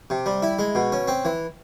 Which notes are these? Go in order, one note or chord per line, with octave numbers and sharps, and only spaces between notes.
C3
G3
E4
G#3
B2
C#4
C4
E3